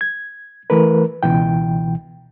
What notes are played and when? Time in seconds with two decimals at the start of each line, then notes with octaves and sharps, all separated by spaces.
0.01 G#6
0.70 E3 A3 A#4 B4
1.23 C#2 B2 E3 G5